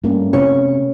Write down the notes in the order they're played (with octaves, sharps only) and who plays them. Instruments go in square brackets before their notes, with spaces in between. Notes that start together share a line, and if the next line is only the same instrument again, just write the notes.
[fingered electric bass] G2 [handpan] A3 A#3 C#4
[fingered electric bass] C3 [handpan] C#4 [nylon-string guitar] C#5